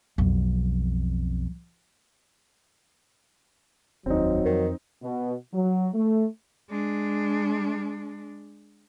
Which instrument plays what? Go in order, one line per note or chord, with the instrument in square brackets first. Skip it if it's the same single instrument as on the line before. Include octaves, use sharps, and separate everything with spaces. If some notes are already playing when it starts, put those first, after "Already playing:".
[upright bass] B1 F2
[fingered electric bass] F1 D#2 [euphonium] F#3 [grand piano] C4 D#4
[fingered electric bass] F2 [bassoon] D#3
[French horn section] B2
F#3
A3
[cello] G#3 D4